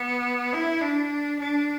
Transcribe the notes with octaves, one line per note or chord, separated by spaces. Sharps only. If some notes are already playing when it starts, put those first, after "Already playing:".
Already playing: B3
E4
D4
D4